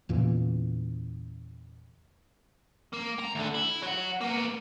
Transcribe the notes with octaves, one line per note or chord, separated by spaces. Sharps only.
E2 A#2 C#3 E3
A#3
C2 A#5
D2 D3
E4
F#3 F#5
A#3 B3